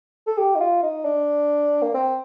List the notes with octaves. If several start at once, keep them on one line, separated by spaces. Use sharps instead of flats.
A4
G4
D#4
F4
D#4
D4
A#3
C4